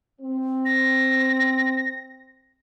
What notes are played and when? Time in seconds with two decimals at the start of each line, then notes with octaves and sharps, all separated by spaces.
0.21 C4
0.65 A#6